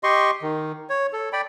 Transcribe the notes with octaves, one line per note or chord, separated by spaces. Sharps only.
G4 D#5 C6 C#6
D#3
C#5
A4
D5 G5 B5